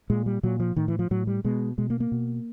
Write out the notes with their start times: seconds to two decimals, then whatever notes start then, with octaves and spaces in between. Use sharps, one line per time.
0.10 A#2 G#3
0.26 G3
0.43 A#2 F#3
0.60 F3
0.76 A2 D#3
0.88 E3
0.99 F3
1.11 A2 F#3
1.27 G3
1.44 B2 G#3
1.78 B2 G#3
1.90 A#3
2.00 A#3
2.12 B2